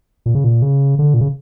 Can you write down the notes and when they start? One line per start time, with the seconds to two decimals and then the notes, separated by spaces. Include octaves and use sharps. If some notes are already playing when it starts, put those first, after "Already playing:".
0.26 A#2
0.35 C#3
0.44 A#2
0.62 C#3
0.99 D3
1.14 A#2
1.21 C#3